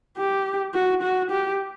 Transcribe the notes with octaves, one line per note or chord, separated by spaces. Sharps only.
G4
F#4
F#4
G4